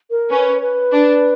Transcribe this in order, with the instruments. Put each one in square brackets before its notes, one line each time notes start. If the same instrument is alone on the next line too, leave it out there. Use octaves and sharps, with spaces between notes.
[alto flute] A#4
[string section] C#4 [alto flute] B4
[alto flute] B4
[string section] D4